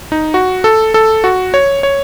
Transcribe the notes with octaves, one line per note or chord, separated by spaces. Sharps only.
D#4
F#4
A4
A4
F#4
C#5
C#5